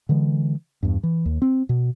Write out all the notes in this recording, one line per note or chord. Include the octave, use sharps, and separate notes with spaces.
D3 E3 G#3
E2 G2
E3
D#2
C4
B2